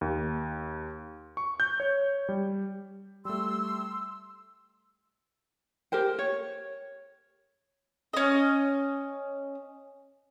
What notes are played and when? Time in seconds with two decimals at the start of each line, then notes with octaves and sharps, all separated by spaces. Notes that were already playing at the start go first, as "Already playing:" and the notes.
0.01 D#2
1.37 C#6
1.60 G6
1.80 C#5
2.29 G3
3.25 G3 A3 C6 E6
5.92 G4 A#4 C5 G5
6.19 C#5
8.13 C#4 D#5